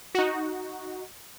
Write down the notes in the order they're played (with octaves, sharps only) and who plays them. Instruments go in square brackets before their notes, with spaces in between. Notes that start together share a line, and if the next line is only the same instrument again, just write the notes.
[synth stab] D#4 F#4